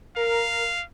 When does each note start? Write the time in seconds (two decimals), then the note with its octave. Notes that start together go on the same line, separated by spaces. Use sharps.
0.16 A#4 F5